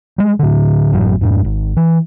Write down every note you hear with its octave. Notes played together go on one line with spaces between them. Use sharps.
G3 G#3
A2 D3
G#1 F#2 A2 F#3
F2 G#2
G#1
E3